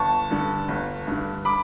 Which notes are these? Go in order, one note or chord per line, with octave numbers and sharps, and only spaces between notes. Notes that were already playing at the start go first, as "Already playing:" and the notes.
Already playing: G1 A5 C#6
G2 D3
G1
G2 D3
B5 D6